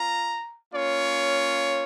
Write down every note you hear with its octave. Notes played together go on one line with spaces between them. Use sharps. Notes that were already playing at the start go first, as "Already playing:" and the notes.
Already playing: C4 F4 A#5
A#3 C#4 F4 C#5